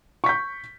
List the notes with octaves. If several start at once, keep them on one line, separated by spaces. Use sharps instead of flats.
C#6 G6 B6